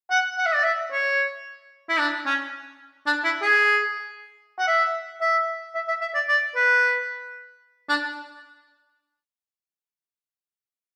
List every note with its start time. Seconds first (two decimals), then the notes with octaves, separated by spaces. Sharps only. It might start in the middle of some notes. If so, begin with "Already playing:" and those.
0.11 F#5
0.38 F#5
0.46 E5
0.55 D5
0.64 E5
0.91 C#5
1.89 E4
1.99 D4
2.26 C#4
3.06 D4
3.24 E4
3.42 G#4
4.59 F#5
4.67 E5
5.21 E5
5.75 E5
5.88 E5
6.01 E5
6.15 D5
6.28 D5
6.56 B4
7.89 D4